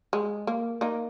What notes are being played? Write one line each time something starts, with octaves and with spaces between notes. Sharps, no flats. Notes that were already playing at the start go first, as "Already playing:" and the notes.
G#3
A#3
A#3 D#4